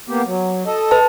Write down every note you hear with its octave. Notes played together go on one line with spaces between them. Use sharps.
A#3 B3 G4
F#3
A4 D#5
B4 A5